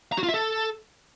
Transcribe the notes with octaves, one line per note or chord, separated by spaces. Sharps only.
A#5
F#4
F4
E5
A4